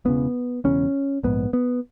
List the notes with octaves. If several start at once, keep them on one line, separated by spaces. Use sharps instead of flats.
E1 E2 C#3 B3
E1 E2 C#3 C#4
A#1 G#2 B3
B3